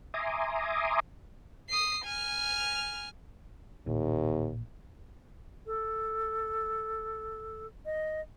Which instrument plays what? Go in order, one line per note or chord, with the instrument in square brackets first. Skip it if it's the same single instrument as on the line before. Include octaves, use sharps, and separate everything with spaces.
[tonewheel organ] E5 G#5 A#5 C6 D6 D#6
[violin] D#6 C7
G#5 F6
[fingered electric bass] A1 A#2 [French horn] D#2
[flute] A4
D#5